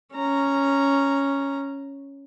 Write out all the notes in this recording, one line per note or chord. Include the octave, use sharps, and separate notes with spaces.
C#4 A#5